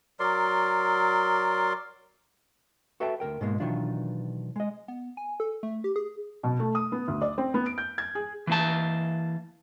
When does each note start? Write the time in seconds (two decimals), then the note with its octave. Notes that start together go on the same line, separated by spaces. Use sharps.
0.20 F#3 A#4 D5 C6
3.00 F#4 A4 B4 E5 G5 A5
3.20 D2 G#2 A#4 G5
3.41 G#2 B2 G#3 A#3
3.60 B2 D#3 E3 F#3 D4 F4
4.56 G#3 D#5
4.88 B3
5.17 G#5
5.40 A4
5.63 A3
5.84 G4
5.96 G#4
6.43 B2
6.59 A3
6.75 D#6
6.92 B3
7.08 D2
7.22 D5
7.38 C4
7.54 B3
7.66 D7
7.78 G6
7.98 G#6
8.15 G#4
8.47 E3 A#3 A5